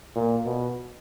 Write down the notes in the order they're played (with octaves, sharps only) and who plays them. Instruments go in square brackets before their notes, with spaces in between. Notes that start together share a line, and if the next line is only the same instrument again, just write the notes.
[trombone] A#2
B2